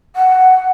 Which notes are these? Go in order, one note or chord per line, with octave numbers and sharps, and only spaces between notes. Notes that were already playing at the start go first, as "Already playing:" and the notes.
F#5